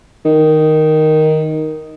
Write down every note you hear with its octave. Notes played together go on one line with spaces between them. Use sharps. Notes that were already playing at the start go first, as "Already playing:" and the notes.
D#3